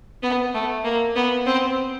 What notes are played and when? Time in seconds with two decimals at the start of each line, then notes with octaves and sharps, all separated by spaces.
0.23 B3
0.54 A3
0.84 A#3
1.16 B3
1.46 C4